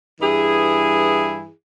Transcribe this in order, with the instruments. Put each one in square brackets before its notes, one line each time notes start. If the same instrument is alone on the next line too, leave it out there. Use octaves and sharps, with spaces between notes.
[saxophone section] G2 E3 E4 G#4